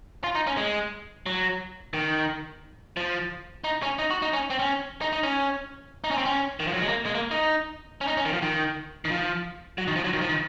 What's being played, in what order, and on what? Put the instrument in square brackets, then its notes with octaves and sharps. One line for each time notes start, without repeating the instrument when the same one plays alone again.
[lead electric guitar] F4
D#4
C#4
G#3
F#3
D#3
F3
D#4
C#4
D#4
F#4
D#4
C#4
C4
C#4
D#4
D#4
C#4
D#4
C#4
C4
C#4
D#3
F3
F#3
G#3
A#3
G#3
A#3
D#4
C#4
D#4
C#4
D#3
F3
D#3
D#3
F3
F#3
D#3
F3
F#3
D#3
F3
D#3